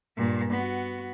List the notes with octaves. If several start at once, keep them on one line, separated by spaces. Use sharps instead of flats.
G2 A#2
B3 F#4